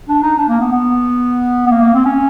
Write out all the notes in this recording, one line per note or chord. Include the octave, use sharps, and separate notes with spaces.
D4
D#4
D4
A#3
B3
B3
B3
A#3
A#3
C4
C#4